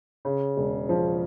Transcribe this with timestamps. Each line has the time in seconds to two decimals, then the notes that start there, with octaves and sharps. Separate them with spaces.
0.25 C#3
0.57 E1
0.89 F3